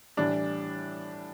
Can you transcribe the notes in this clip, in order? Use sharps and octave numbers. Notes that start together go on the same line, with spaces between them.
A2 E3 G3 D4